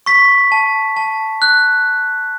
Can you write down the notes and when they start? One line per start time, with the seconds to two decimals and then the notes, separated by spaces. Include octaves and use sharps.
0.06 C#6 B6
0.52 A5
0.97 A5
1.42 F#6